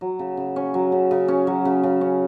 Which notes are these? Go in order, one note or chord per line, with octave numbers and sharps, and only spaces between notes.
F#3
C#3
C#3
C#4
F#3
C#3
C#3
C#4
F#3
C#3
C#3
C#4